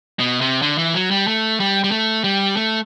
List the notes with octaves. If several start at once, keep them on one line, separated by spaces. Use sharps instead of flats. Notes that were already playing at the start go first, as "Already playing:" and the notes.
B2
C3
D3
E3
F#3
G3
A3
G3
G3
A3
G3
A3